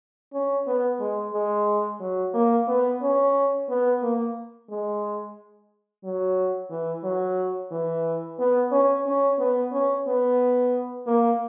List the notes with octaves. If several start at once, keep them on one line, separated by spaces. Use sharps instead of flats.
C#4
B3
G#3
G#3
F#3
A#3
B3
C#4
B3
A#3
G#3
F#3
E3
F#3
E3
B3
C#4
C#4
B3
C#4
B3
A#3